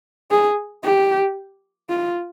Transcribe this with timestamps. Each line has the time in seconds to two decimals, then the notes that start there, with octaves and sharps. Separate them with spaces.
0.31 G#4
0.84 G4
1.90 F4